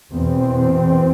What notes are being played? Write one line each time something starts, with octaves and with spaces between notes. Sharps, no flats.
E2 B2 C4